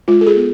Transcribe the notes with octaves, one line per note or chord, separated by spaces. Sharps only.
G#3 F4
A4
G#4
B3